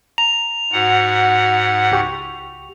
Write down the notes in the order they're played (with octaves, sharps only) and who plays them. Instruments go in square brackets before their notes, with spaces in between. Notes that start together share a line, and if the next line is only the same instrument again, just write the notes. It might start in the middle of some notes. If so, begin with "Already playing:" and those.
[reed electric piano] A#5 [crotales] F7
[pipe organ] G#2 F#5 [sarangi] F#4
[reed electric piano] C#2 G4 C#6